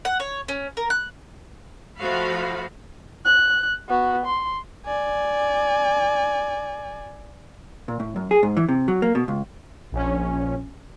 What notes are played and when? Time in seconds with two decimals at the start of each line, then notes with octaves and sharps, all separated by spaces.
0.05 F#5
0.20 C#5
0.48 C#4
0.77 A#4
0.90 F#6
1.97 F3 A3 F#4 F5 B5
3.25 F#6
3.89 B3 F#4
4.26 C6
4.86 D5 G#5
7.88 A#2
8.00 A2
8.16 F#2
8.31 G#4
8.43 G#2
8.57 E3
8.69 C3
8.88 F#3
9.02 A#3
9.15 B2
9.28 C#2
9.92 A#1 C#4